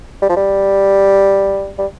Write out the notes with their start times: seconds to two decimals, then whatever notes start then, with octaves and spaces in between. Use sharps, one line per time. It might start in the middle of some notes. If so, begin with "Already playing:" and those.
0.22 G3
0.29 F3
0.36 G3
1.78 G3